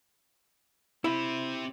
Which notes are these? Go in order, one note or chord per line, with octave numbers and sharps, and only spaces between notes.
C4 E4 G4